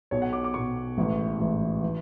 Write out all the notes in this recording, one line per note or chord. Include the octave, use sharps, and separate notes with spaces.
B1 B2 C#5
F#5
D6
D6
B1 B2 C#6
A1 G#2 E3
A1 G#2 E3
E3